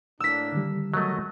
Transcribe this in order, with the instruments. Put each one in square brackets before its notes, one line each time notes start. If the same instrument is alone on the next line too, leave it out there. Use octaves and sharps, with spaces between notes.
[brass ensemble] A2 A#3 D4 [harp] E6 B6
[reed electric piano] D3 D#3 G3
[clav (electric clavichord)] F#3 A3 [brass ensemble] A#4 C#5 D#5